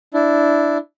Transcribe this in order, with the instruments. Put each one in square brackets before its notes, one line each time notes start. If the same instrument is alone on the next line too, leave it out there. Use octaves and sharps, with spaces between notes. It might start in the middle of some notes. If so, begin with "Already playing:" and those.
[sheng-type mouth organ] D4 E4